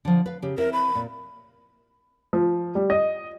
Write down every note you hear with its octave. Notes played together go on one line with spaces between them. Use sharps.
D3 F3
B4 F5
C#3 G4
C4 E4 A#4 E5
B5
A#2
F3
G3
D#5